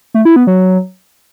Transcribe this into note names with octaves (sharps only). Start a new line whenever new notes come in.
A3
E4
B3
F#3